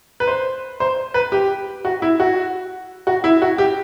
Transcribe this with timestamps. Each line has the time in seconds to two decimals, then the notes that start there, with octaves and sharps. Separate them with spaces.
0.20 B4
0.27 C5
0.80 C5
1.14 B4
1.32 G4
1.85 F#4
2.02 E4
2.20 F#4
3.07 F#4
3.24 E4
3.42 F#4
3.58 G4